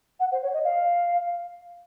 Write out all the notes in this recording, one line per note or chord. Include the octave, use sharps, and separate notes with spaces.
F#5
C5
C#5
D#5
F5